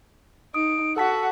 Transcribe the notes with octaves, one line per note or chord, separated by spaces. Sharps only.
D#4 D#6 D7
F#4 A4 F#5 A5 E6 B6